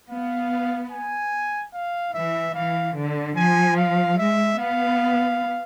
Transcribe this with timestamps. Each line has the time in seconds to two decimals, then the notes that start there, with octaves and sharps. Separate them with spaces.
0.10 B3 F5
0.91 G#5
1.73 F5
2.14 E3 E5
2.55 E3 F5
2.96 D3
3.36 F3 G#5
3.77 F5
4.18 G#3 E5
4.59 B3 F5